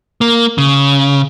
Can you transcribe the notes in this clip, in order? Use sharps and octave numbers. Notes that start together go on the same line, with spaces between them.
A#3
C#3